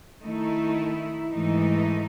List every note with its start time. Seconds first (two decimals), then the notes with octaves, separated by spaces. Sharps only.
0.23 D#3 A3 D#4 E4
1.31 G#2 E3 A3 D#4